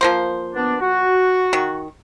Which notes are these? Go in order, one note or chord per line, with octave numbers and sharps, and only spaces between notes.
F3 A#3 C5
B3 D4
F#4
D#3